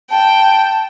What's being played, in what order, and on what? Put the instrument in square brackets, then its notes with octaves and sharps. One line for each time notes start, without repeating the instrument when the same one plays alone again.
[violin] G5 [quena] A5